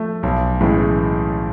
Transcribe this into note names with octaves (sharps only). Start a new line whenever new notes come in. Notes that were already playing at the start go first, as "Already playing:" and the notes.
Already playing: F3 A3
B1
A2 E3 G#3 C#4